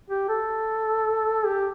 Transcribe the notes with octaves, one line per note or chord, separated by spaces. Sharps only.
G4
A4
G4